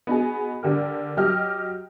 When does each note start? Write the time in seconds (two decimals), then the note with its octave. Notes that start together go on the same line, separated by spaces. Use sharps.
0.07 B3 D#4 F#4 G#4
0.63 D3 G4 A#4
1.17 F#3 G4 D#5 F6